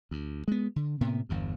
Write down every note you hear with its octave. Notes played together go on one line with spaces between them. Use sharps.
D2
G#3 B3
D3
A2 C3 A#3 B3
G1 E2 G2